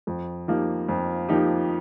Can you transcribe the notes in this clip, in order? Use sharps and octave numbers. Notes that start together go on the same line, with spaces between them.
F2
F3 A#3 D#4 G4
F2
F3 A#3 D#4 G4